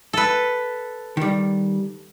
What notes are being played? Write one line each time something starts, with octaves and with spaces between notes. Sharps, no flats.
A4 B4
D#3 G3